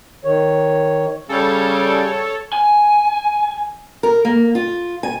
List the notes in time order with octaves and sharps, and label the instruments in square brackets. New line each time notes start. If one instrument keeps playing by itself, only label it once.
[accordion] D#3 C#5
[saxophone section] C#3 G3 [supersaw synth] A4 C#5
[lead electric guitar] G#5
[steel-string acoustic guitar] A#4
A#3
F4
G#5